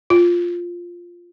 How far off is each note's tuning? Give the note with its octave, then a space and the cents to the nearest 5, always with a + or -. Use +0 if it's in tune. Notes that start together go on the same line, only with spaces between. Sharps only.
F4 +0